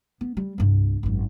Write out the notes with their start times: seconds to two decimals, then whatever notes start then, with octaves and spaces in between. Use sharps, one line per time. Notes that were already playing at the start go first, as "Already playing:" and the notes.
0.21 B3
0.37 G3
0.58 C2 G2
1.03 G#1 F#2